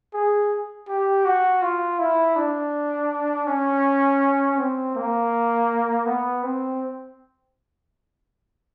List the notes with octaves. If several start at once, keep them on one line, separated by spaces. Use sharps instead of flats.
G#4
G4
F#4
F4
E4
D4
C#4
C4
A#3
B3
C4